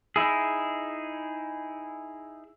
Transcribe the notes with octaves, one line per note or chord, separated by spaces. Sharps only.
D#4 E4 G#4